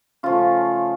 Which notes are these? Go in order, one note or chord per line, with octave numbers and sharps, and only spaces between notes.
C#3 F3 A3 F4